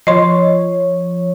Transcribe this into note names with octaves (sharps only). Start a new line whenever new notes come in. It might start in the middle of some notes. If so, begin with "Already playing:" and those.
F3 C#5 D#5 C6